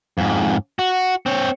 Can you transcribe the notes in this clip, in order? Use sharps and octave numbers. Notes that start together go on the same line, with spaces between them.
F2 G#2
F#4
C4 C#5